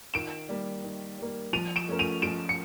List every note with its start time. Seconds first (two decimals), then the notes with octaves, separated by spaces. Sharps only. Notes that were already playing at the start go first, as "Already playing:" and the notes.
0.14 D#3 D7 E7
0.49 G3 A#3
0.83 D#3
1.18 G3 A#3
1.53 F3 D#7 F7
1.76 D7 E7
1.88 A3 C#4 F4 A#4
1.99 D#7 F7
2.22 F3 D7 E7
2.49 C#7